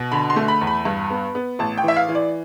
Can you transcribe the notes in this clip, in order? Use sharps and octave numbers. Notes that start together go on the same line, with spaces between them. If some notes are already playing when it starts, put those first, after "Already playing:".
Already playing: B2
D3 B5
C6
A3
B5
E2
B5
G2
B3
B3
A1 A5
G5
E3 E5
F5
E3
D5